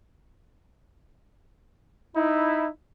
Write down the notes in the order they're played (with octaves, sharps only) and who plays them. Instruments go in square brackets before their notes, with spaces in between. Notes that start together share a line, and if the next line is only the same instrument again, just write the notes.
[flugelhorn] D#4 [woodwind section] E4